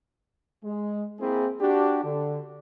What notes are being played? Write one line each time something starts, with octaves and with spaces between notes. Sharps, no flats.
G#3
A#3 C4 E4 G#4
D4 F#4 G4
D3